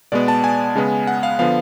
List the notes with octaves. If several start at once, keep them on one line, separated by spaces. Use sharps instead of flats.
B2 G#3 B3 D5
A5
G#5
C#3 G#3 B3
F#5
F5
D3 F3 B3 F5